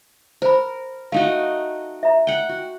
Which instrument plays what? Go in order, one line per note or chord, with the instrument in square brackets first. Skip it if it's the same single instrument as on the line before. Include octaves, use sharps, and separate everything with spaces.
[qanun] A#4 [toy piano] C5 B5
[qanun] A3 D#4 F#4 [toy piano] F5
[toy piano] E5 A#5
[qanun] F#5 G5
F#4